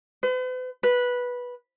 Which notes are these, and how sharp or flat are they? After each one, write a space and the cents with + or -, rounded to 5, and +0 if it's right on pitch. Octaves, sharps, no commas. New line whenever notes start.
B4 +45
B4 -10